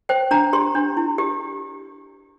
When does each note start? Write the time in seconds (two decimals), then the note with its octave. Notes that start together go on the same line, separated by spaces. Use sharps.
0.09 C5 G5
0.31 D4 A#5
0.53 G4 C6
0.75 D4
0.97 E4
1.18 G4